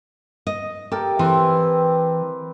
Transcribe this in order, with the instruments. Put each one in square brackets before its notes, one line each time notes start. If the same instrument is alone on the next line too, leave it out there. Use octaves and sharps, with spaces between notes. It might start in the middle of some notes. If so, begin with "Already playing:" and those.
[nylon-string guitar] D#5
[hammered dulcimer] G4 A#4 A5 [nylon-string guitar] A4
[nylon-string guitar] E3 [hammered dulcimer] C4 B4